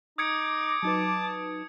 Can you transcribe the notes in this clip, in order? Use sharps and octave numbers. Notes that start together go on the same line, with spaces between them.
D#4 D6 D#6 G#6 C#7
F#3 D#4 B4 A5